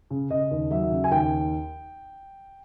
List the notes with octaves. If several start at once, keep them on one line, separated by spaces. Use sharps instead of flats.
C#3
C#3 D#5
D#2
F#3 E5
C#3
G#5
D#2 G5